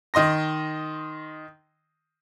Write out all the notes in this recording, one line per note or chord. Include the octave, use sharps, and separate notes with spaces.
D#3 D#5 C6 A#6